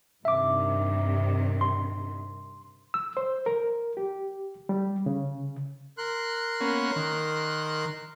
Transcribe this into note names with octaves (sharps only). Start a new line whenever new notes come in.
G2 C3 D#3 E5 D6
C6
E6
C5
A#4
G4
G3
C#3
A#4 C6 F#6
A#3 B3 C#4
D#3